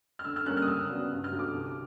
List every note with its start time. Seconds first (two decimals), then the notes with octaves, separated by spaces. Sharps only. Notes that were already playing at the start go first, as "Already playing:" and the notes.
0.19 F6
0.25 D3 E6
0.36 F6
0.46 G3 A#3 C#4 F#6
0.57 F6
0.62 D#6
0.67 C#2 E6
0.89 C#3 F#3 B3 D4
1.11 G2
1.24 F6
1.32 D3 F#3
1.39 D6
1.53 C2